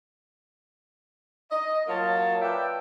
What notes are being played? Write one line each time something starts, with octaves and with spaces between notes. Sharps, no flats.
D#5
F#3 A#3 F4 C#5 A5
B4 D5 E5 G5